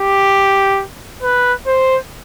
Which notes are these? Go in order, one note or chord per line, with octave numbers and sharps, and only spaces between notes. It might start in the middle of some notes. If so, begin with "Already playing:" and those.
Already playing: G4
B4
C5